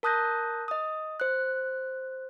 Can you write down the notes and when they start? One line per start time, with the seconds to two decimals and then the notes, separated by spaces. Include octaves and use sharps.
0.03 A#4 A5 D#6 F#6 G6 A#6
0.68 D#5 D#6
1.20 C5 F#6